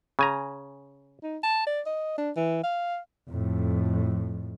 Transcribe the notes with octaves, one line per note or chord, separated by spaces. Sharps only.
C#3 G#5 A#5
D#4
A5
D5
D#5
D4
E3
F5
F2 A2